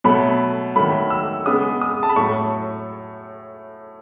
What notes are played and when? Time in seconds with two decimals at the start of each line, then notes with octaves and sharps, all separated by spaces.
0.04 B2 F#3 A3 B5
0.76 D#3 F#3 A3 B5
1.10 E6
1.46 C#3 G#3 B3 D#6
1.81 D#6
2.03 A5
2.09 B5
2.16 A2 F#3 A3 C#6